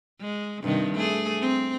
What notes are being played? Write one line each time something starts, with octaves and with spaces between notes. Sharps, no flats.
G#3
G2 C3 D#3
A3 G#4
C4